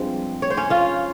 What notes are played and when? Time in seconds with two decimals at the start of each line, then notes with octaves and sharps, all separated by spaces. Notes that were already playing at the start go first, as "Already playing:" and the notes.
Already playing: G2 F3 G#3 C4
0.42 C#5
0.50 C5
0.57 C#4 C#5
0.70 F4 F5